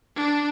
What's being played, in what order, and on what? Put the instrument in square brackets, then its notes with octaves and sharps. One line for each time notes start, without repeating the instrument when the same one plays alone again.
[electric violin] D4